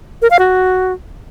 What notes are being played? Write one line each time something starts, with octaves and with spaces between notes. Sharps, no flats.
A#4
F5
F#4